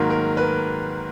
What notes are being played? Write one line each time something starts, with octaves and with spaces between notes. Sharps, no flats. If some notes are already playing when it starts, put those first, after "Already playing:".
Already playing: G#2 D#3 F#3 A#3 A#4
A#4
B4